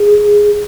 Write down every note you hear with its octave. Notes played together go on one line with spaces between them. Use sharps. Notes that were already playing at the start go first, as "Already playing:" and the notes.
Already playing: G#4